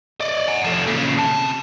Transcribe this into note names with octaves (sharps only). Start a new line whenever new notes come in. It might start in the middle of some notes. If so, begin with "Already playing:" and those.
D5 D#5
F#5 G#5
F3 A3
A#2 C#3
C3 A5